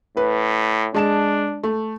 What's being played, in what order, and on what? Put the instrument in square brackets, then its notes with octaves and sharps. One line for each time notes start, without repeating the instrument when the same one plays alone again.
[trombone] A2 [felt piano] B4
[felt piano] G#3 A5 E7 [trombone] D4
[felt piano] A3